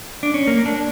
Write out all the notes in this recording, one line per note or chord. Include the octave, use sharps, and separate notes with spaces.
D4
C#4
A#3
D4